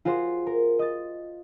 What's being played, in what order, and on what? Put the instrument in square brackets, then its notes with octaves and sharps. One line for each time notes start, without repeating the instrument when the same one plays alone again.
[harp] F4 F#4 G#4 C5
A#4
D#5 A6